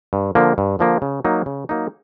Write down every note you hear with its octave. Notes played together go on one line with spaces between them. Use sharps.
G2
D3 F3 A#3
G2
D3 F3 A#3
C#3
F#3 A#3 D#4
C#3
F#3 A#3 D#4